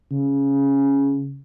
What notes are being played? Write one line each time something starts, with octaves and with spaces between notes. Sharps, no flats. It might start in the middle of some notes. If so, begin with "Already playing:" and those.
C#3